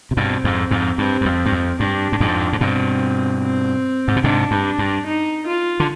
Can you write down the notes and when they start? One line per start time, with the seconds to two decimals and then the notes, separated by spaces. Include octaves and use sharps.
0.11 C3
0.17 G2 B2 C4
0.44 F2 G#2
0.71 F2 G#2
0.98 G2 C4
1.21 G2
1.26 F2
1.46 G2
1.52 F2
1.79 G2 D4
2.12 G2
2.20 F2 G#2
2.53 G#2
2.61 G2 B2 C4
3.43 C4
4.08 G#2
4.16 B2
4.24 G#2 C3 D4
4.51 G2
4.64 D4
4.79 G2
5.05 D#4
5.46 F4
5.80 D3